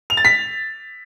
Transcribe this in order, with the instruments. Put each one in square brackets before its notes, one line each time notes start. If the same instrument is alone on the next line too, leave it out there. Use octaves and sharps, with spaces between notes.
[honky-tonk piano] F7
A6
B6